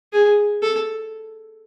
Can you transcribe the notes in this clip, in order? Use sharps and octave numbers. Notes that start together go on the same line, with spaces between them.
G#4
A4